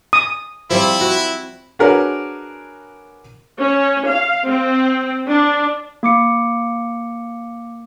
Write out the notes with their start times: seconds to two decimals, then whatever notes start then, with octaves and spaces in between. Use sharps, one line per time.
0.13 D#6
0.70 F3 G3 C4 E4
1.01 F#4
1.79 D4 F#4 G#4 A#4 B4 C#5
3.59 C#4
4.09 F5
4.48 C4
5.27 D4
6.03 A#3 D6 C#7